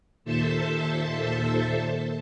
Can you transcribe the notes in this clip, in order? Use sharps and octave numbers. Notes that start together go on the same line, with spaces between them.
D#2 A#2 A4 C5 E5 A5